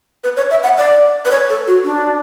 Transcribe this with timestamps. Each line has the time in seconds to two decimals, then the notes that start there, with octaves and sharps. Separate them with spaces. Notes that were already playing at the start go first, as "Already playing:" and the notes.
0.24 B4
0.37 C#5
0.51 E5
0.63 F#5
0.77 D5
1.25 B4
1.31 C#5
1.50 A4
1.67 F#4
1.84 D4